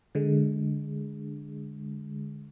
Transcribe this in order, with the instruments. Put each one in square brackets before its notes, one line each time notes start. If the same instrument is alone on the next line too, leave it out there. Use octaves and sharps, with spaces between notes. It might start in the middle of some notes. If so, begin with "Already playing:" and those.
[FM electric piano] D3 G#3